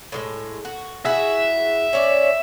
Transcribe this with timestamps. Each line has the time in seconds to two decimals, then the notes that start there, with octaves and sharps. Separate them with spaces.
0.12 A2 E3 G#3
0.65 F#4
1.05 E4 F#4 G#4 E5
1.93 C#4 C#5 D5